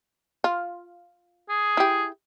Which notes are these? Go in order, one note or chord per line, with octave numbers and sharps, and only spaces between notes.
F4
G#4
E4 G4